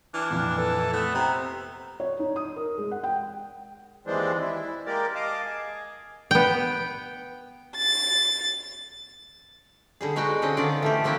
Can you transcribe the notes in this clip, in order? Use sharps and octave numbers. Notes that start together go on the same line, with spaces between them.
E3 D4 F6
F2 A#2
A4 B4
A3 B3 E6
C3 C5 A#5
C#5
D#4
D#6
A#4
G#3
F#5
G5
D#2 E3 G#3 C4 D4
E4
G#3 A#3 G4 A#4 D5
D#5 F5 A5 D6
G#4
B3 G5
A6
D3 G3 G#4
B2 G#3 D#4 F#4 G5
D3 C4 C#4 D#5
D3 D#3 F4 D5
E3 A3 G4
F3 A#3 C4 F#4 G4